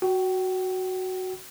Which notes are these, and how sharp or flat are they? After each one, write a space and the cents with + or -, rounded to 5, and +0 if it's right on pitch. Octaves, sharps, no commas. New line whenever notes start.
F#4 +0 G5 -35